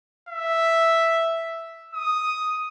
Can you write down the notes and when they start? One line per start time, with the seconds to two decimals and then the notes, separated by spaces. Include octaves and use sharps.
0.29 E5
1.94 D#6